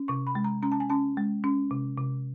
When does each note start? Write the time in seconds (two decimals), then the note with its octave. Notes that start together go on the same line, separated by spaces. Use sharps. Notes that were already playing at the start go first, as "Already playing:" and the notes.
Already playing: C#4
0.08 C3 C#6
0.27 B5
0.35 G#3
0.44 A#5
0.63 C#4 A#5
0.72 A5
0.80 G#5
0.90 C#4 A5
1.17 G#3
1.44 C#4
1.71 C3
1.98 C3